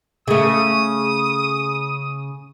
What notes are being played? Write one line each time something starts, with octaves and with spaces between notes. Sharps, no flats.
C#3 A3 D#6